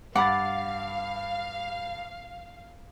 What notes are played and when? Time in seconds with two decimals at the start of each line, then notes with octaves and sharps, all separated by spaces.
0.15 G2 F5 F#5 B5 D6 A6